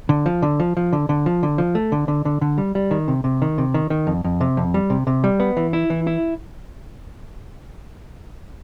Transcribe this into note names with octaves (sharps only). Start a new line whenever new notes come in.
D3
F3
D3
F3
F3
D3
D3
F3
D3
F3
A3
D3
D3
D3
D3
G3
G3
D#3
C3
C3
D#3
C3
D#3
D#3
F2
F2
C3
F2
G3
C3
C3
G3
B3
E3
E4
E3
E4